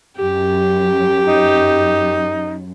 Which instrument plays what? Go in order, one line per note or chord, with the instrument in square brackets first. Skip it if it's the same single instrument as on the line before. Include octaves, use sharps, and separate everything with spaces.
[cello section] F#2 [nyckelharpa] G4
[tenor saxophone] D#4